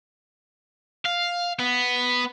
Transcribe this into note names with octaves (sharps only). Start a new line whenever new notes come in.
F5
B3